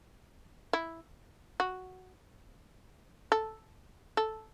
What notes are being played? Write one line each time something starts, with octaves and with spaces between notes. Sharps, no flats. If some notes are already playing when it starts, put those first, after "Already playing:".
E4
F#4
A4
A4